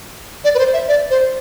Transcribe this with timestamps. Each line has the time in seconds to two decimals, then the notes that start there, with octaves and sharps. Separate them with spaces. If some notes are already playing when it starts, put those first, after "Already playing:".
0.44 D5
0.55 B4
0.59 C5
0.73 E5
0.88 D5
1.10 C5